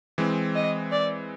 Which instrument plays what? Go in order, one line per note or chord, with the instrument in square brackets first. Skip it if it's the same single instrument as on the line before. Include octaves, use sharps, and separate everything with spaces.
[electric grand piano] E3 G#3 C4
[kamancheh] D#5
D5